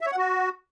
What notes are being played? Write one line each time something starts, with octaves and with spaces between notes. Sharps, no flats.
E5
C#5
F#5
F#4